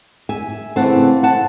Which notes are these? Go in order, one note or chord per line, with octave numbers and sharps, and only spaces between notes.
E5 G#5
C#3 E3 A3 C4 F#5 A5
F#5 A5